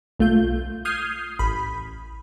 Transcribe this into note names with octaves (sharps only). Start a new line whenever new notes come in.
B1 A3 F4 G6
D#6 F6 G6 G#6 C7
A1 B5